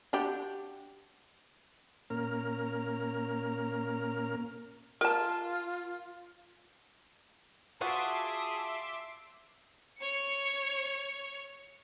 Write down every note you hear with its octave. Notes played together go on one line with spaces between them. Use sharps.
D4 F#4 G4
A#2 A#3 C#4 A#4 F6
F4 A#4 A5
F4 F#4 G#4 E5 F#5 A5 C6 D6
C#5 C#7